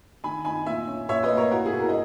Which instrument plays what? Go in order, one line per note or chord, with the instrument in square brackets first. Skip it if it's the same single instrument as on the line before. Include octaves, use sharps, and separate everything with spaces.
[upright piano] D#3 G#5 B5
D#4 G#5 B5
A#2 E5 G#5
C#4
A#2 C#5 E5
B4 D#5
A#3
A#4 C#5
E4 F#4 A#4
E4 G#4
B2
F#4 A#4
D#5